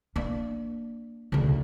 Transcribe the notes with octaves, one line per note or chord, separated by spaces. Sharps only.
A#3 D4
D2 C#3